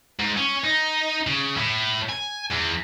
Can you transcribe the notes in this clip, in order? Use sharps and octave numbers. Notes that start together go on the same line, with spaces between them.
G#2
C#4
D#4
C#3
A2
G#5
E2